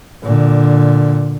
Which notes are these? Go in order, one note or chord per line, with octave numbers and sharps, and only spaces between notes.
A#2 D3